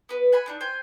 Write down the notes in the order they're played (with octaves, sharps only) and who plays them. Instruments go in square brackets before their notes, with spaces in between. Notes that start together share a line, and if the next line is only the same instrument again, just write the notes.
[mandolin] B3 B4
F#5 G#5 B5
B3 D4 D#4
C5 G5 G#5